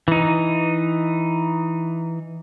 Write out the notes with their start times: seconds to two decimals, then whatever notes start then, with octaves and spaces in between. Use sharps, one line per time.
0.08 E3 D#4